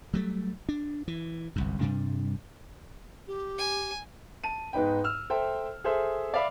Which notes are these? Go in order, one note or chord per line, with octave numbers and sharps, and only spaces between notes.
F#3 G3 A3
D4
E3
G1 C2 F#2
G2 C3 G3 D4
G4
G#5
A5 D#7
G#2 B3 D#4 B4 G5
E6 F6
A4 C5 E5 G5 A5
G#4 A4 C5 E5
D5 E5 F5 B5 D6